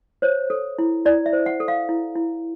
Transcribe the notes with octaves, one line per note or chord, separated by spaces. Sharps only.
C5 C#5
A4
E4
E4 D5
E5
C5
F#5
A4
F5
E4
E4